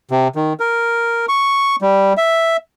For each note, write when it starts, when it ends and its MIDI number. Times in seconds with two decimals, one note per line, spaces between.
0.11 0.28 48
0.36 0.53 51
0.60 1.26 70
1.29 1.76 85
1.82 2.13 55
2.17 2.57 76